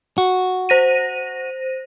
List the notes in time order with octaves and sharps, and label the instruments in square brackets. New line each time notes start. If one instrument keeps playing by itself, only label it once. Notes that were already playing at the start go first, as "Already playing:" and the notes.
[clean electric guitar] F#4
[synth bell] C5 A#6 D#7